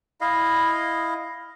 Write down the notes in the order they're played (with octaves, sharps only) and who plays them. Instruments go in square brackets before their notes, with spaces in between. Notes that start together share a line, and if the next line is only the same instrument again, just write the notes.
[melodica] E4 D#5 F5